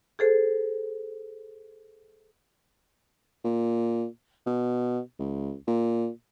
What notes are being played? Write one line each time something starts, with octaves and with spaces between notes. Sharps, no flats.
G#4 A4 C5
A#2
B2
C#2
A#2